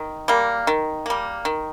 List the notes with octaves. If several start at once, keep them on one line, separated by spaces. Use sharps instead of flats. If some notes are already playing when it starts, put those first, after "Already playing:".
Already playing: D#3
G3 A#3
D#3
G3 A#3
D#3